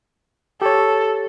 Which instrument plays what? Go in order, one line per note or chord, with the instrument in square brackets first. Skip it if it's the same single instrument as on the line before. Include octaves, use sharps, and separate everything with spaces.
[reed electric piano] G4 C#5 [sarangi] A4